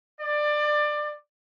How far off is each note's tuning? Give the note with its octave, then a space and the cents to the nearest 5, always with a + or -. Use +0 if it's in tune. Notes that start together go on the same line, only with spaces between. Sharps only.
D5 +20